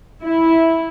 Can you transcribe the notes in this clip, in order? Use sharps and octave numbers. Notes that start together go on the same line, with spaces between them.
E4